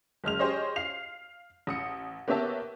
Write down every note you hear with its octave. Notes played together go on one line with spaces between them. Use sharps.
F#1 G#3 F6 F7
G4 G#4 C5 C#5 D#5
F5 C7 F7
A1 D#6 C#7
A#3 B3 G4 C#5 E5 A5